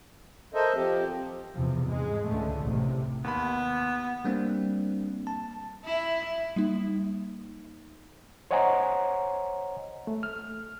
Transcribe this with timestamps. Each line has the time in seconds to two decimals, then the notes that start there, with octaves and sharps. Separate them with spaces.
0.54 A4 A#4 C5 D#5 E5
0.76 F3 C4 G4
1.53 E2 C3 F3
1.86 G#2 G#3
2.27 C#2 D3 A3
2.64 A1 C3
3.24 D#2 B3 B5
4.25 G3 A#3 C4 D4
5.27 A5
5.85 E4
6.56 G3 A#3 D#4
8.51 C5 C#5 D#5 F#5 G#5 A#5
10.07 A3
10.23 F6